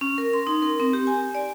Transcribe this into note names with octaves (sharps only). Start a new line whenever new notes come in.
C#4
A#4
C6
D#4
A#4
C4
G4
G#5
D5